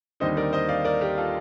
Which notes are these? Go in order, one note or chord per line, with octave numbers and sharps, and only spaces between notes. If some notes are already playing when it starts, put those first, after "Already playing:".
D#2 D3 G3 C4 D#4 C5 D#5
A#4 D5
C5 D#5
D5 F5
A#4 D5
G4 A#4
F4 A4